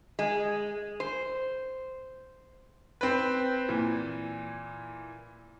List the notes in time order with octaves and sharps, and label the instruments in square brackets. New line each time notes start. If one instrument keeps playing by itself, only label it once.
[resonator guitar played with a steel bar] G#3
C5
[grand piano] C4 B4
A#2 E3